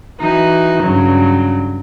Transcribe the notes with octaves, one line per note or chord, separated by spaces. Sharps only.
E3 D#4 F#4
G2 C#3 F#3